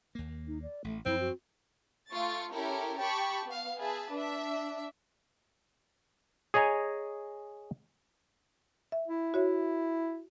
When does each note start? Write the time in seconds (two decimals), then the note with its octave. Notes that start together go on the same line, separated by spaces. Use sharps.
0.15 D#2 A#3
0.47 D#4
0.62 D5
0.84 A1 A3
1.05 F#2 F3 C4 E4
1.20 F#4
2.11 A3 F4 C#6 A6
2.53 C#4 E4 G4 A4 A#4
2.99 G4 G5 A5 B5 C#6
3.46 B3 F5
3.81 G#4 B4 E5 A5
4.14 D4 E5
6.54 G#4 C#5 D#5 G#5 A#5
8.92 E5
9.08 E4
9.34 F#4 C#5 E5